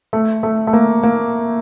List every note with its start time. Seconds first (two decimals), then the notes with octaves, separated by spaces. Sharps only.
0.13 A3
0.43 A3
0.67 A3
0.73 A#3
1.03 A#3